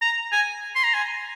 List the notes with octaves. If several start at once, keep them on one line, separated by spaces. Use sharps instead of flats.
A#5
G#5
C6
A#5
G#5